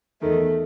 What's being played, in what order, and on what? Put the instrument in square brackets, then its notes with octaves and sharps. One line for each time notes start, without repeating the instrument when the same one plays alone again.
[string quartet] E2 D#3 A3